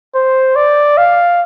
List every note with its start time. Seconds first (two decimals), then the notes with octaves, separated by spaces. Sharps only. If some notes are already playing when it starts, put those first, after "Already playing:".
0.15 C5
0.56 D5
0.98 F5